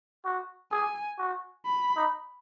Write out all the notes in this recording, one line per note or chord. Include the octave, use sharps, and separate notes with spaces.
F#4
G#4 G#5
F#4
B5
D#4